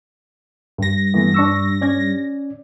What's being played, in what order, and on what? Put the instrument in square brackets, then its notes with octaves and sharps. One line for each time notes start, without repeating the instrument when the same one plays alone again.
[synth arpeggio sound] G2 A#6
[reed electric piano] E3 A3 B3
D4 C#6 E6
C#4 D5 G#6